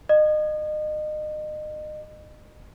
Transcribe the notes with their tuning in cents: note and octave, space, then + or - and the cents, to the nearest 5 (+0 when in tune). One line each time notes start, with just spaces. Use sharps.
D#5 -30